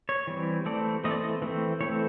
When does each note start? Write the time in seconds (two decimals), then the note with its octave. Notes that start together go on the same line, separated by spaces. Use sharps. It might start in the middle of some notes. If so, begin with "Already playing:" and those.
0.09 C#5
0.27 E3 G3 C4
0.66 E3 A3 C4 D5
1.04 E3 A3 C4 D#5
1.11 D5
1.18 D#5
1.42 E3 A3 C4
1.81 E3 A3 C4 C#5